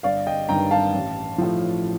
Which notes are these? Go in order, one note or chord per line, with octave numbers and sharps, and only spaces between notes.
G1 D5 F5
D#5 G5
G2 D#3 G5 A#5
F5 A5
A1
A2 F3